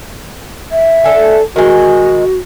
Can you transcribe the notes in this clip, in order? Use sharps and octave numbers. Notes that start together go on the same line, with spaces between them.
E5
D4 A4 G#5
D#3 G#3 F#4